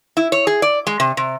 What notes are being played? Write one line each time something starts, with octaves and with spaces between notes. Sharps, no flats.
E4
C#5
G#4
D5
G#3
C3
C3